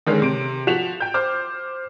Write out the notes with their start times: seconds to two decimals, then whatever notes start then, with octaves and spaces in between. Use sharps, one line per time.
0.07 D3 D#3 G#3 C#4
0.22 C3 D7
0.67 F3 F#4 B6 E7 F7
1.00 G5 G6
1.14 C5 D6 F6